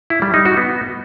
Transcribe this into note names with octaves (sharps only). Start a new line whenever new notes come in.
E4
G3
D#4
F#4
B3